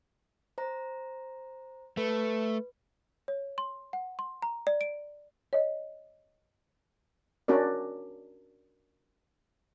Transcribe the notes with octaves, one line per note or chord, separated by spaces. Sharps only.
C5 A#5
A3 B4
C#5
C6
F#5
C6
A#5
D5
D7
C#5 D#5
C#4 D4 F#4 A#4 D5